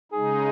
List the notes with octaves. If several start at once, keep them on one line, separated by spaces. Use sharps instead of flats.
C#3 G#3 D#4 G#4